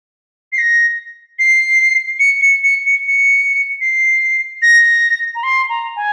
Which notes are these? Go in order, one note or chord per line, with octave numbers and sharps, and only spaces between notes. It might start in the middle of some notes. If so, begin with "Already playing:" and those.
C7
A#6
C7
C#7
C#7
C#7
C#7
C#7
C7
A#6
A#5
C6
A#5
G#5